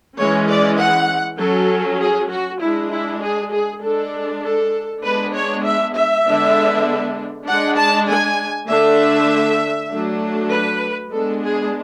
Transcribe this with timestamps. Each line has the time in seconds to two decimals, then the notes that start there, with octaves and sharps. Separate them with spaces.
0.18 E3 G#3 C#4 C#5
0.48 D5
0.78 F#5
1.39 F#3 C#4 A4
2.00 G#4
2.30 F#4
2.60 G#3 D4 E4
2.91 E4
3.21 G#4
3.52 G#4
3.82 G#3 D4 A4
4.43 A4
5.03 G#3 B3 D4 B4
5.34 C#5
5.65 E5
5.95 E5
6.25 D3 G#3 B3 D4
7.47 G#3 D4 F#5
7.77 A5
8.08 G#5
8.68 D3 A3 D4 E5
9.90 F#3 A3 D4
10.51 B4
11.12 G#3 B3 D4 A4
11.43 G#4